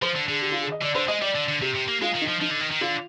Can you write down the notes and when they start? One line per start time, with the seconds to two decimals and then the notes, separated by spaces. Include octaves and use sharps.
0.02 F3 C5
0.15 D3
0.28 D3 G#4
0.42 G4
0.52 F4
0.62 G#4
0.72 D#5
0.82 D3 D5
0.95 D3 C5
1.08 G#3 D#5
1.22 G3 D5
1.35 D3
1.48 D3
1.62 C3 G4
1.75 C3
1.88 A#3
2.02 G#3 F4
2.15 D#3
2.21 D#4
2.28 F3
2.41 F3 D#4
2.51 D3
2.61 D#3
2.72 D#3
2.81 D3 F4